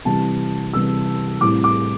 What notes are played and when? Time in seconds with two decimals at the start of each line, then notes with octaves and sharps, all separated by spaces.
0.05 C3 E3 G3 A5
0.74 C3 E3 G3 E6
1.41 A2 G3 C4 E4 D6
1.64 D6